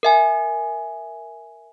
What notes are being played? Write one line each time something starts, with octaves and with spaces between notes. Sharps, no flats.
A#4 E5 G#5